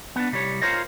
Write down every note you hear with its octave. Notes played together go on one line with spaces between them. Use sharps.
B3 D4
C2 G3 C#5
F4 A#4 C5 C#5 D#5